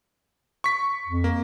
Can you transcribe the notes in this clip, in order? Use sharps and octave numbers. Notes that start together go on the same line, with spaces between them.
C#6 B6
F2
A#3